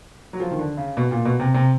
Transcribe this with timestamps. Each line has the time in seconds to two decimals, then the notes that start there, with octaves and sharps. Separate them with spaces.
0.33 F#3
0.40 F3
0.51 D#3
0.59 D3
0.77 C#3
0.97 B2
1.11 A#2
1.25 B2
1.40 C3
1.54 C3